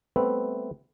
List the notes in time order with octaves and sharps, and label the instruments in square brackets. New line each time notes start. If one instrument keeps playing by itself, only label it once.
[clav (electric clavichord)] G3 A3 B3 C4 B4 E5